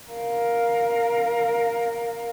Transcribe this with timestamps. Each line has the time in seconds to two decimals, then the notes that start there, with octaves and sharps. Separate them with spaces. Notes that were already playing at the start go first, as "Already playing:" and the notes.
0.11 A#4 F5